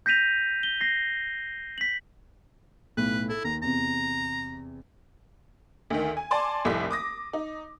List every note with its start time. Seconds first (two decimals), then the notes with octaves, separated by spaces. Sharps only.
0.06 G6 A#6 B6 D#7 F7
0.63 G7
0.81 A#6 C7
1.78 B6 F#7
2.97 B1 A2 B4
3.29 E4 A4
3.44 D#2 A#5
3.62 E2 C3 A#5
5.90 D2 D#3
6.17 G#5
6.31 D5 G#5 A5 C6 D6
6.65 F1 C2 A2 E4 B6
6.91 D6 D#6 A#6
7.33 D#4